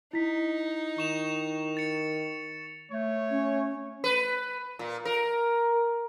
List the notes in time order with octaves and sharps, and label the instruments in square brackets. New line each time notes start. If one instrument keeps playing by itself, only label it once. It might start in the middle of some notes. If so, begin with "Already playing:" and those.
[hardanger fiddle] D#4 [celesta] E4 B6
[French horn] D#3 [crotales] C#6 E7 F7
[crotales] A6 C#7
[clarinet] A3 [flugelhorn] C#5
[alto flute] C#4
[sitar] B4
A#2
A#4